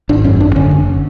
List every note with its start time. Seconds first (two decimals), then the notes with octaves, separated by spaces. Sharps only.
0.09 G#1 D4
0.24 F#2 C#4
0.40 G#1 D4
0.56 D3 C#4
0.71 F#1